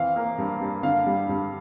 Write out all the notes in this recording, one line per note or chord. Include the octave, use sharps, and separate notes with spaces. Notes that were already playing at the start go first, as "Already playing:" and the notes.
Already playing: E3 C4 F5
A#3
G2
G2
D3 F5
G3
G2